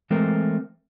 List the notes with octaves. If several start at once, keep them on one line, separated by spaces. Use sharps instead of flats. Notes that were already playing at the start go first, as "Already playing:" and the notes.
E3 G#3 A3 C4 A#4 C5